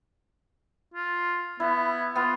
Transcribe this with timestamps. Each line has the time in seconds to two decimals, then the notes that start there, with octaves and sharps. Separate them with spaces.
0.94 F4
1.60 B3 E4
2.16 B3 F4